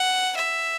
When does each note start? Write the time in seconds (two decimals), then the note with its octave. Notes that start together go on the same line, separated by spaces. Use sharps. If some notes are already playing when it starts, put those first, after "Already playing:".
Already playing: F#5
0.37 E5